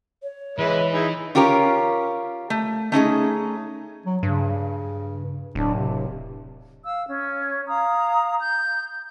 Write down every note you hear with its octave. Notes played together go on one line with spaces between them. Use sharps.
C#5
E3 G#3 B4 E5
D#4 E4 G#4
C#4 F4 G4 A#4 C#5
A3
A3 C#4 D#4 G#4
F#3
G2 C#3
D1 D4
C3
F5 E6
C#4
F5 A#5 D#6
G6